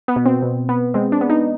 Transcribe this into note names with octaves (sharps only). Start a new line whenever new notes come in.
B3
B2
C4
B2
B3
G#3 C4
D4
B3
D#4